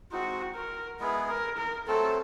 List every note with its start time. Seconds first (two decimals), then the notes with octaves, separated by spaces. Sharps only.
0.11 G#3 C4 D#4 F#4
0.55 A#4
0.99 G#3 B3 E4 G#4 B4
1.29 A#4
1.57 A#4
1.87 F#3 A3 C4 A4